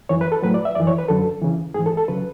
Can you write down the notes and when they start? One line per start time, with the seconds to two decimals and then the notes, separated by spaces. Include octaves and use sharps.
0.09 F#2 E3 C#5
0.21 B4
0.32 A4
0.42 A2 F#3 B4
0.54 D5
0.65 E5
0.75 F#2 E3 D5
0.87 C#5
0.98 B4
1.08 F#2 D3 F#3 A4
1.42 E2 C#3 E3
1.74 G#2 E3 G#4
1.86 A4
1.97 A4
2.08 C#3 F#3 B4